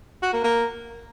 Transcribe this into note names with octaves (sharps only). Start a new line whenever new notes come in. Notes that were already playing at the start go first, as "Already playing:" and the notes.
F#4
A#3
A#3